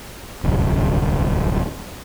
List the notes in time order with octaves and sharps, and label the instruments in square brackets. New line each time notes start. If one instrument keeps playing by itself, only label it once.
[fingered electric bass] D1 G1 C2 F#2